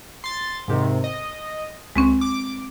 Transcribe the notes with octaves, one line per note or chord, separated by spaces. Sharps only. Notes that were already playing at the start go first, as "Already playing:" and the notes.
C6 A6
G#2 C3 D#3
D#5
C#2 G#3 C4 C#4
D6